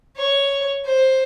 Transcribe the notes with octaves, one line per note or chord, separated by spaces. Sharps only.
C#5
C5